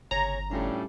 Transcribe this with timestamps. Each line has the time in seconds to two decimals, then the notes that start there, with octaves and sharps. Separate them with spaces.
0.11 G1 C#3 C#5 A#5
0.51 A2 G3 C#4 D4 F4 A4